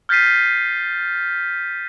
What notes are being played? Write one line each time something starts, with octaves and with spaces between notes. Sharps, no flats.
F6 G6 A6 B6 C7 D#7